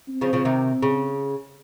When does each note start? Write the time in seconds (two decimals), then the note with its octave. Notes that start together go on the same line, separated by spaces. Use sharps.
0.09 C4
0.21 C#3 F3
0.33 C#3 F3
0.45 C3 D#3
0.82 C#3